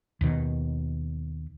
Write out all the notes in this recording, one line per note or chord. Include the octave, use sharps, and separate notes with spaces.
D#2 B2 D#3